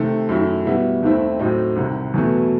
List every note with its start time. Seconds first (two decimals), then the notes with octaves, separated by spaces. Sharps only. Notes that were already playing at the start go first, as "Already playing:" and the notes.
Already playing: C3 D#3 A3
0.29 F#2 D#3 A3 E4
0.65 B2 G3 B3 E4
1.03 D#2 D#3 A3 C4 E4
1.39 A2 F#3 C4 D#4
1.76 C2 C3 D#3
2.14 E2 B2 F#3 A3